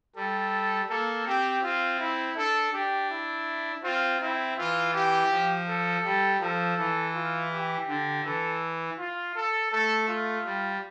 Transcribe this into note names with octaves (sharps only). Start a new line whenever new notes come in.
G3 A4
A#3 A4
C4 G4
C4 F4
E4
D4 A4
D4 G4
E4
C4 F4
C4 E4
E3 F4
G4
F3
A4
G3
F3 A4
E3
F4
G4
D3
E3 A4
F4
A4
A3 A4
F4
G3